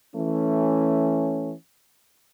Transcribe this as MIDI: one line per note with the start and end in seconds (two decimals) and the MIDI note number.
0.14 1.53 52
0.14 1.53 57
0.14 1.53 61